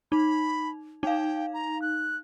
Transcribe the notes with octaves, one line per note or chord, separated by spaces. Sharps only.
D#4 B5
D#4 F5 G5
A#5
F#6